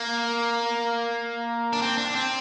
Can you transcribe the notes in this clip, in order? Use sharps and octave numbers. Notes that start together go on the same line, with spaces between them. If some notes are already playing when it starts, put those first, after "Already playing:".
Already playing: A#3
D4
C4
D4
C4